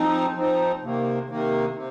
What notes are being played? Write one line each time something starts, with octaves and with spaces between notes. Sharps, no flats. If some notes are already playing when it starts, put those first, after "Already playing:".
Already playing: F3 C4 D#4
F3 C4 D#4
C3 D#3 A#3
C3 D#3 A#3
C3